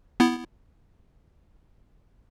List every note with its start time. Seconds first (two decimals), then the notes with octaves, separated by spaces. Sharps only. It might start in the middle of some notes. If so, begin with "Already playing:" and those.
0.20 B3 E4